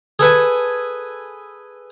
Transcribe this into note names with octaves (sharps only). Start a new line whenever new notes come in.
G#4 A4 B4 G#5